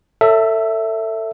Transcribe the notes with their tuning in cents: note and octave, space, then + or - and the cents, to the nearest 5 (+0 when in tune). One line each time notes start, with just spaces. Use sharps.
A4 +25 C#5 +30 E5 +0